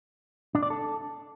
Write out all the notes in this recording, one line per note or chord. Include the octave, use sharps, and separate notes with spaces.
D4
D5
A4